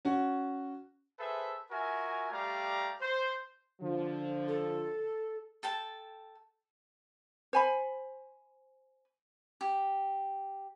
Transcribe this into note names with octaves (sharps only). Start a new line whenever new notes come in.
C#4 F#4
G#4 A4 B4 C5 E5
F4 F#4 A#4 E5 G#5
G3 A3 G4 D5 F5 A#5
C5
D3 F3
A4
A4 G5 A5
C5 G#5 B5
G4